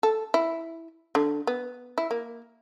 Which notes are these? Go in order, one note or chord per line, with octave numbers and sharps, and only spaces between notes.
A4
E4
D3
B3
E4
A#3